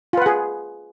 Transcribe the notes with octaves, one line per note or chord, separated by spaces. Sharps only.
F4 G#4 B4 F#5